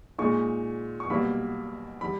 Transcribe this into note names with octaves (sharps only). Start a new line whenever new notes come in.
A#2 G#3 D#4 C#6
C#6
B1 B2 G3 A#3 B5
G3 B5